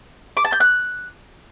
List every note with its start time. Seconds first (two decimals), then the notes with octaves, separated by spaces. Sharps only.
0.37 D6
0.45 A5
0.52 G6
0.60 F#6